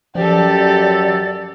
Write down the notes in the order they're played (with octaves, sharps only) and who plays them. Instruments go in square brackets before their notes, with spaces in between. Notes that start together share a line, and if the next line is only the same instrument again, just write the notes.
[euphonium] F#2 [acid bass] F3 [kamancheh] G4 A4 [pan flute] D5